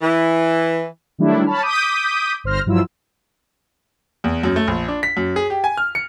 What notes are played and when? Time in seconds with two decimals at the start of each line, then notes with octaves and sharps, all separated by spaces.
0.02 E3
1.18 D#3 F#3 G3 A3 D4 E4
1.46 C#5 A5 B5 F6
1.63 D6 D#6 G6 B6 D#7
2.44 G1 C5 F6 A#6
2.66 G2 F3 F#3 E4 F4 E6
4.24 E2
4.43 F#2
4.56 A3
4.68 A#1
4.88 D4
5.03 B6
5.17 F#2
5.36 G#4
5.50 G4
5.64 G#5
5.77 F6
5.95 C#7